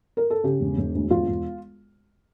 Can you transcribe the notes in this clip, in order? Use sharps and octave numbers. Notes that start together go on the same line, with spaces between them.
A#4
A4
C#3 G4
E1
E1
D2
E1 F4
E1